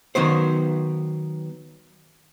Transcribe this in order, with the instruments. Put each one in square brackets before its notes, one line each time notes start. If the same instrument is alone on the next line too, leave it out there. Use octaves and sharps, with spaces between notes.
[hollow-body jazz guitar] D#3 F#3 B3 C5